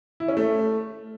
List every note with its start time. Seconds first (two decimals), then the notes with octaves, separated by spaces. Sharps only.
0.20 E4
0.28 C#4
0.37 A3